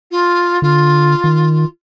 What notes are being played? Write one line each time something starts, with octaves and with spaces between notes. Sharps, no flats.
F4
D3 F4
D#3